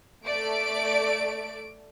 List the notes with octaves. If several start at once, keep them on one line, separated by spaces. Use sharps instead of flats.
A3 D5 D7